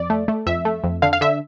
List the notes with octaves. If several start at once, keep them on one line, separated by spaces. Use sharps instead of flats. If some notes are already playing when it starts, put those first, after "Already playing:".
Already playing: F2 D5
A3
A3
F2 E5
A3
F2
D3 F5
F5
D3 E5